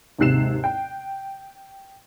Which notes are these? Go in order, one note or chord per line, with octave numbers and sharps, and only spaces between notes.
D#2 G#2 C3 F#6 C7 E7
G5